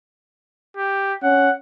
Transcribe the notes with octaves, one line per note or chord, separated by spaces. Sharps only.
G4
C#4 F#5